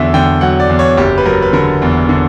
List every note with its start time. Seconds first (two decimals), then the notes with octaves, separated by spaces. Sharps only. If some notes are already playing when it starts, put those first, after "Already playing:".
Already playing: E2 D3 F#3 E5
0.14 D3 G5
0.41 F#3 F#5
0.60 D5
0.69 E2
0.79 C#5
0.97 F#1 G4
1.18 B4
1.26 F#3 A#4
1.42 B4
1.53 D3 A#4
1.82 E2
2.09 D3